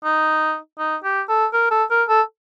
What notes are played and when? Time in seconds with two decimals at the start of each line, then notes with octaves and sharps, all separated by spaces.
0.04 D#4
0.79 D#4
1.04 G4
1.29 A4
1.53 A#4
1.71 A4
1.91 A#4
2.09 A4